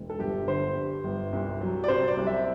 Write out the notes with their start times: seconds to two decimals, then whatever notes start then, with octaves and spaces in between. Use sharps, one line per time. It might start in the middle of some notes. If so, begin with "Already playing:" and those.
Already playing: E1
0.10 A4
0.19 G1 G4
0.47 D3 C5
0.75 G2
1.04 G1
1.33 C2
1.61 F#3
1.84 D5
1.88 C3 C5
2.08 D5
2.17 C2
2.27 E5